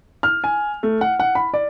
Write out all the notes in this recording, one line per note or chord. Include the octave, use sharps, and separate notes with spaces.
F6
G#5
A3
F#5
F#5
B5
D5